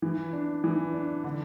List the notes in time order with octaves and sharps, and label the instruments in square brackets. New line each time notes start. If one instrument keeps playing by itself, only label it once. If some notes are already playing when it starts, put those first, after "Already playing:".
[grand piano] E3
D4
E3
D4
D3